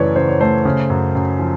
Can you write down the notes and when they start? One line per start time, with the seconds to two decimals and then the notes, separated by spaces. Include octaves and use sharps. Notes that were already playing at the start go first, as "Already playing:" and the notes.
Already playing: F#2 C#3 E3 A3 C#5 D5
0.16 C#3 C5
0.29 C#5
0.40 A3 C5
0.65 C#3
0.90 F#2
1.15 F#2
1.39 F3